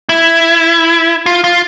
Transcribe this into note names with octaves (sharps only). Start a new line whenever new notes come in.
E4
F4
F4